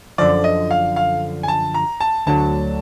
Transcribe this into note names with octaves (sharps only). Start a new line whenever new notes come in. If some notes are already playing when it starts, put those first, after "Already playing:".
F#2 D3 F3 D5
D#5
F5
F5
G#5
A5
A#5
A5
D2 D3 F#3 A5